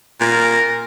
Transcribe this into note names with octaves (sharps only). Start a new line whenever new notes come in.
A#2 A#4